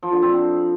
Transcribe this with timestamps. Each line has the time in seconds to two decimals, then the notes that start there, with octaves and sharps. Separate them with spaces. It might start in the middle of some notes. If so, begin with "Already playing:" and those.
0.03 F3
0.12 D3
0.22 C4